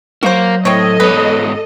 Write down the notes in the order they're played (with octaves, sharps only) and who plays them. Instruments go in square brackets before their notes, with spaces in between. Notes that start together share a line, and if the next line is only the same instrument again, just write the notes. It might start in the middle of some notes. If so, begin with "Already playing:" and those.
[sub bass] F#3 [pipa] F#4 C5 [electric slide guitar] A#4 F5
[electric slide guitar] A2 [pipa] C4 C#5 [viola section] A4 D#5
[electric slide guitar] G#2 B3 C#5 [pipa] B4